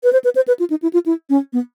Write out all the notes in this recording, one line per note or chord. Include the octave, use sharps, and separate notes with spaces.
B4
C5
B4
C5
B4
F4
D#4
E4
F4
E4
C#4
B3